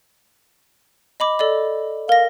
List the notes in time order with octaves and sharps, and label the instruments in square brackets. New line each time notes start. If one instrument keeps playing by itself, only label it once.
[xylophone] D#5 B5 D6
A4 D5 D#5
[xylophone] A#4 A#6 [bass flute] F5